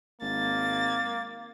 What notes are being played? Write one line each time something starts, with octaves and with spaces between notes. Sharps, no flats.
G#1 A#3 A6